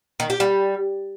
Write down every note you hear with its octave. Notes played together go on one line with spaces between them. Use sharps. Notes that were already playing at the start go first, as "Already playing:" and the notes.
D#3
G4
G3